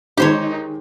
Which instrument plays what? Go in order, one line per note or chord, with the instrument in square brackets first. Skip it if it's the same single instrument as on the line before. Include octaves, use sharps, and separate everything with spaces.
[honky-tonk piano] D#3 G#3 [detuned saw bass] D#4 [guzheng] G4 C5 C#5